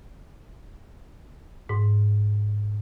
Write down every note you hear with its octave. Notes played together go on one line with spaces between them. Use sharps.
G#2